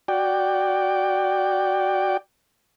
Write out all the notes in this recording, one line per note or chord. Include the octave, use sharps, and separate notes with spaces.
F#4 D5 G5